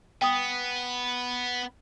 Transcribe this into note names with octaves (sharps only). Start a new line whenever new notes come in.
B3 G5 D#6